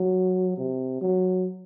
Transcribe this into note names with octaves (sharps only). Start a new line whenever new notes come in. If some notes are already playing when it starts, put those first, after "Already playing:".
Already playing: F#3
C3
F#3